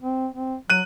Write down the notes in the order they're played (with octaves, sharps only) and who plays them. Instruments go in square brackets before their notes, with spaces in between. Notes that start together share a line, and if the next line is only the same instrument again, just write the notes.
[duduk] C4
C4
[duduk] F#3 [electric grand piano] F#6 D#7